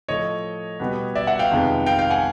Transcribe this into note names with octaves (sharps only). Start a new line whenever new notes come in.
A2 F3 A3 C#5 D#5
B2 G3 B3
D5 E5
E5 F#5
F5 G5
F2 C3 D#3 G#3 B3
F5 G5
F5 G5
F#5 G#5